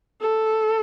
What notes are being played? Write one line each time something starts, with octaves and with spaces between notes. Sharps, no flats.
A4